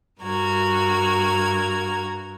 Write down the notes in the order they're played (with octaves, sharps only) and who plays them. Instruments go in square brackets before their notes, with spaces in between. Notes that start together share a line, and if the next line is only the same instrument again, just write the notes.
[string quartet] G2 F#4 A#4 G#6